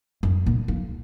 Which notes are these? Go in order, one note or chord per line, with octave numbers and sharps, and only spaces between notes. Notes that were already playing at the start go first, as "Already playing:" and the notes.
F#2
A#2
F3